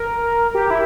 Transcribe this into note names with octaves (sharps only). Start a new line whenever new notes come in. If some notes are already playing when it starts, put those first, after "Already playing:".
Already playing: A#4
G4
E4